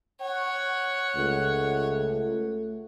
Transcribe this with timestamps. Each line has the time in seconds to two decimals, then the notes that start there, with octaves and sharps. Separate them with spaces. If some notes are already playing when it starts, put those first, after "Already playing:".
0.21 C#5 F#5
1.16 C#2 A3